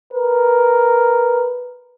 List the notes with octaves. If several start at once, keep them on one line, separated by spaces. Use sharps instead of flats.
A#4 B4